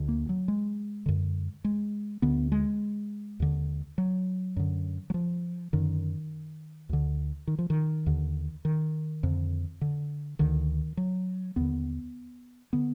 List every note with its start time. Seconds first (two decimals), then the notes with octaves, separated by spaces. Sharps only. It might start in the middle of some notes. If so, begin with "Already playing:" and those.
Already playing: D2 D3
0.09 A#3
0.29 F#3
0.48 G#3
1.06 F#2 D3
1.64 G#3
2.22 D2 D3 B3
2.52 G#3
3.40 D#2 D3
3.98 F#3
4.56 F#2 D3
5.10 F#3
5.14 F3
5.73 F#2 D3 D#3
6.89 D2 D3
7.47 D#3
7.59 F3
7.70 D#3
8.06 D#2 D3
8.65 D#3
9.23 F2 D3
9.81 D3
10.39 D2 D3 D#3
10.97 F#3
11.56 D#2 D3 B3
12.73 D3 B3